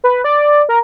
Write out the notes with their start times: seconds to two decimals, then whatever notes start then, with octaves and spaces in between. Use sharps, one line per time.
0.04 B4
0.24 D5
0.69 A#4